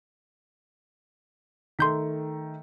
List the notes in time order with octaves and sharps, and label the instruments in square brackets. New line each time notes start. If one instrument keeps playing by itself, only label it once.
[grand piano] D#3 A3 [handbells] C6 G6 B6